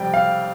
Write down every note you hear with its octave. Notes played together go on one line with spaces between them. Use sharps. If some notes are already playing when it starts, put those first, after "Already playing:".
Already playing: F2 C3 G3 G5
F5